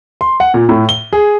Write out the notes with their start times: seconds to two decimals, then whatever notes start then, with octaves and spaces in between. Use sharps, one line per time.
0.21 C6
0.40 F#5
0.54 A#2
0.69 A2
0.89 G7
1.13 G#4